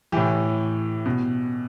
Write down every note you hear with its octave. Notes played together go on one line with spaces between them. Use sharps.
A2 E3 G4
B2